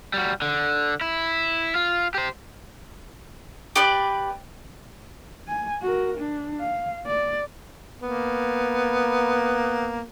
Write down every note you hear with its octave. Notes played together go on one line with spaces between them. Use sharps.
G3 F#4
D3
E4
F4
G4 C5
G4 B4 D5
G#5
F#4 A#4
D4
F5
D5
A#3 B3